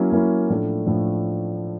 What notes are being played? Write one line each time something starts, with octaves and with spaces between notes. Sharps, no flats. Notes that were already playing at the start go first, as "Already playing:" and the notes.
Already playing: F#3 A#3 C#4 E4
F#3 A#3 C#4 E4
A2 F3 A3 D4
A2 F3 A3 D4